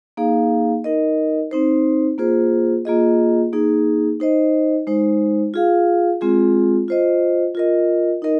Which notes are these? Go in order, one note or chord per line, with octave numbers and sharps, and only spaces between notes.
A#3 D#4 G#4 F5
D#4 A#4 D#5
C4 D#4 C5
A#3 F4 G#4 C5
A#3 F4 G#4 D#5
A#3 D#4 G#4
D#4 C5 D#5
G#3 D#4 C5
F4 G#4 F5
G#3 C4 F4 G#4
F4 C5 D#5
F4 A#4 D#5
D#4 A#4 D#5